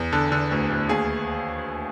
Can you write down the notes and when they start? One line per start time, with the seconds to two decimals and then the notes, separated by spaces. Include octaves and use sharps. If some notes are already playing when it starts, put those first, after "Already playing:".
Already playing: E2
0.12 D3 A4
0.32 D3
0.51 D2
0.70 D2
0.89 D#2 G#4